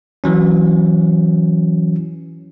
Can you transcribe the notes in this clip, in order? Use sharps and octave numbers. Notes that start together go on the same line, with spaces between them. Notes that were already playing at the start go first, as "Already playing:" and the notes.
E3 F#3 C#4